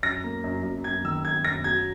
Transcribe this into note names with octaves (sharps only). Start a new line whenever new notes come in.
F#2 A#6
A#3
F#2
F#2
F#2 G#6
D#3 E6
F#2 G#6
F#2 A#6
F#3 G#6